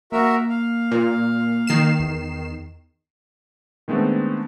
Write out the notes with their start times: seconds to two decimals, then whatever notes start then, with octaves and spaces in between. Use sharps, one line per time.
0.12 A#3 F#4 A#4 E5
0.49 F5
0.91 A#2
1.67 D#3 C7 E7
2.00 E2
3.88 D#3 G#3 A3 B3 C4 D4